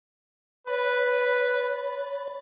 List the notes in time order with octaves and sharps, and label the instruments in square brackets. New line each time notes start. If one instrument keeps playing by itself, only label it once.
[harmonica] B4 [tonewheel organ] C#5 B5 A6